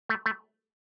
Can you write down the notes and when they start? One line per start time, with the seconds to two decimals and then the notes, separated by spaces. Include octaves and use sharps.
0.09 A3
0.26 A3